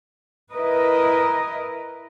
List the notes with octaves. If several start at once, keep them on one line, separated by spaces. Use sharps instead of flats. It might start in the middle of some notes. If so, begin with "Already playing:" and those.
E4 A#4 B4 D#5